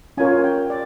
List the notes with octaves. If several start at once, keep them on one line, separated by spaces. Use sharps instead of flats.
C#4 F4 A#4 C#5 G#5
G5
D5